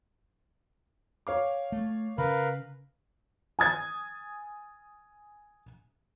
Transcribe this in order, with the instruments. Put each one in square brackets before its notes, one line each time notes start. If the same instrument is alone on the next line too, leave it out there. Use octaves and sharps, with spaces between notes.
[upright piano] C#5 F5 D6
[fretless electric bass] A3
[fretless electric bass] C#3 [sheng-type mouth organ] A#4 B4 F5 [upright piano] B5
[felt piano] G#5 D#6 G#6 A6